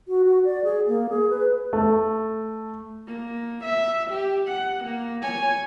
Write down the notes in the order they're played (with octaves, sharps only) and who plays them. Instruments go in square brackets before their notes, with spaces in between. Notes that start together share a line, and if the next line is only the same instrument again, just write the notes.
[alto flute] F#4
F#4
D5
G#4
A#3
G#4
B4
[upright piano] A3
[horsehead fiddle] A#3
E5
G4
F#5
A#3
C#5 G#5